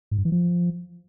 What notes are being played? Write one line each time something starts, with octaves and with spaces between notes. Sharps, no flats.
G#2
G2
E3
F3